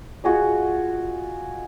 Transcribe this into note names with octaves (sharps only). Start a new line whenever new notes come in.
F4 F#4 G#4 D#5